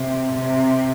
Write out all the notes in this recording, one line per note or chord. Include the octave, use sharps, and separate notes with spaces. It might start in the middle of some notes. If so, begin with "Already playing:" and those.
Already playing: C3
C3